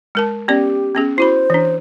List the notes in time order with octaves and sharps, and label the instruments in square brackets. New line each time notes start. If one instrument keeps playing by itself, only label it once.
[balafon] G#3 A#4 A5
[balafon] B3 C#4 D5 [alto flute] G4
[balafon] B3 C#4 G#4
[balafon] E4 F#4 B5 [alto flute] C5
[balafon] E3 D4